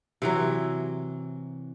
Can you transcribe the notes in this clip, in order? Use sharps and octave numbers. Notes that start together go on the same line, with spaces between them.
C3 E3 F#3